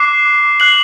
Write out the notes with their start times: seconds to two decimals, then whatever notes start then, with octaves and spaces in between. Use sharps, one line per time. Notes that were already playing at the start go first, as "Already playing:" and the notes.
Already playing: D6 F#6 C7
0.60 F#6 C7 F#7